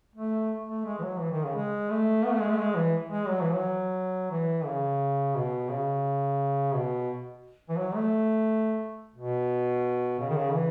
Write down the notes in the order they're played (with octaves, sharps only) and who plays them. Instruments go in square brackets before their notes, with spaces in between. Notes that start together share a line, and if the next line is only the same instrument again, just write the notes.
[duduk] A3
A3
G#3
E3
F#3
E3
D#3
C#3
G#3
A3
B3
A3
G#3
A3
G#3
E3
G#3
F#3
E3
F#3
E3
C#3
B2
C#3
B2
E3
F#3
A3
B2
C#3
D#3
C#3
E3